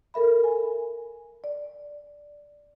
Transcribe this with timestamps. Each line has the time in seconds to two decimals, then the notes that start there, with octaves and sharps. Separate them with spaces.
0.14 A4 A#4 E5 B5
0.44 G#5
1.44 D5